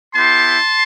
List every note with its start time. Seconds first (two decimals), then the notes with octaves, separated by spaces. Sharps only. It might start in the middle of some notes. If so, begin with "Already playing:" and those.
0.15 B3 E4 G4 A5 C6